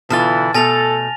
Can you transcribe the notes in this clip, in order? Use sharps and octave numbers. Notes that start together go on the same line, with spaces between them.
B2 D3 E3 F4 A5 F6 A6
B2 A3 A4 G#5 A#6 F7